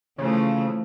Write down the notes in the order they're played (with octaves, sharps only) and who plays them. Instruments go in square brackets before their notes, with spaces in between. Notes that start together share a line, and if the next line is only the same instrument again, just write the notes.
[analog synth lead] C#3 [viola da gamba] E3 F3 A3